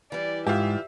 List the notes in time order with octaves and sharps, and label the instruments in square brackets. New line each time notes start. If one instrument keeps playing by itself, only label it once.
[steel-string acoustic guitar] E3 G3 [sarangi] D5
[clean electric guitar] G#2 [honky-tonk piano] F4 G4 [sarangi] E5